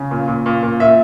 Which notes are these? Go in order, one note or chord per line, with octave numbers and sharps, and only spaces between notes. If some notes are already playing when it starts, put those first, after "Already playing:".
Already playing: C#3
A#2
A#2
A#2
A#2
A#2 E5